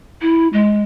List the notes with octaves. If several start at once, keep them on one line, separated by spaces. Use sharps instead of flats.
E4
G#3